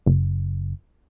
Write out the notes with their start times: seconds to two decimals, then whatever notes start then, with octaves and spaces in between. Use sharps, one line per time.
0.06 F#1